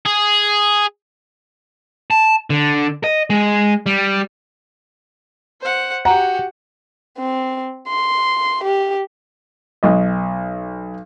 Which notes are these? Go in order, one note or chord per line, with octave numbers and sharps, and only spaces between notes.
G#4
A5
D3
D#5
G#3
G3
C5 F#5
F#4 G4 F#5 A#5
C4
C6
G4
B1 D#5